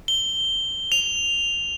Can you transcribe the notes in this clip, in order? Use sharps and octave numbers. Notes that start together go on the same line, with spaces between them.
G7
F7